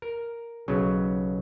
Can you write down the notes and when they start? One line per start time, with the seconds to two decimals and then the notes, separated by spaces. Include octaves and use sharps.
0.02 A#4
0.68 B1 C#3 F#3